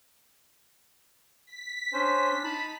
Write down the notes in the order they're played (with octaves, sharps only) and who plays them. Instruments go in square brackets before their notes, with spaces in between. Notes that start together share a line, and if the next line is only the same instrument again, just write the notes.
[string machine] B6
[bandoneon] C#4 C5 [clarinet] D4
[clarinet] D#4 [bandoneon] A5 B5